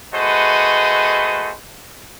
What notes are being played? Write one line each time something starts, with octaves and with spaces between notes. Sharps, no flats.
A3 F#4 G#4 B4 C5 D#5